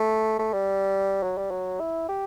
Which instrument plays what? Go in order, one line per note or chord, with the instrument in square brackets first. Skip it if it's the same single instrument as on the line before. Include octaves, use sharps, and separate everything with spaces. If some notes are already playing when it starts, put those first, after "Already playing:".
Already playing: [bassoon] A3
A3
G3
F#3
G3
F#3
E4
G4